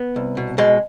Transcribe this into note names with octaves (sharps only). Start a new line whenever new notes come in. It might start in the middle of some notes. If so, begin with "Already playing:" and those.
Already playing: B3
C2
B2
B2 G#3